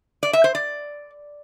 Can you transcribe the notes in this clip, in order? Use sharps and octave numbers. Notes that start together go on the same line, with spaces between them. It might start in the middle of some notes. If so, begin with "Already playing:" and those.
D5
E5
C5
D5